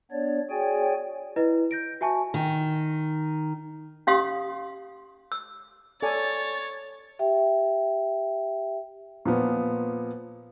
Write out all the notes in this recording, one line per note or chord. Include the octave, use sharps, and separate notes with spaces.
B3 D4 C#5 D5
F#4 G#4 C#5 D5 G5 G#5
E4 B4 D#5
G6 A#6 D7
F#4 E5 G#5 A5 C#6
D#3
C#4 G4 F5 C6 D#6
E6
A4 C#5 D5 G#5 A6
G4 E5 G5
A#2 F3 B3